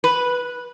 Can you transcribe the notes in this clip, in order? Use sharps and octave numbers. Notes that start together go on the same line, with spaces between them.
B4